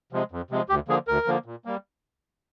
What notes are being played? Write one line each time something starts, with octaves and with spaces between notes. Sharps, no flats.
C3 F3 G#3
F2
C3 F3 G#3
D2 G4
D3 F3 A#3 G#4
D2 A#4
D3 F3 A#3
A#2
G3 A#3